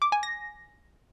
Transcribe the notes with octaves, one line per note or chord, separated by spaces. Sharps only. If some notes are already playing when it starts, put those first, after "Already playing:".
D6
G#5
A#6